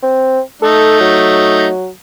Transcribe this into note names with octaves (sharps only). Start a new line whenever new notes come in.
C4
A3 D#4 A4
F#3